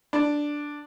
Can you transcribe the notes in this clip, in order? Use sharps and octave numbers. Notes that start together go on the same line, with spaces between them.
D4